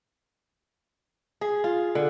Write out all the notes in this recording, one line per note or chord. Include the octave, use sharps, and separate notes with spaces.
G#4
F4
D3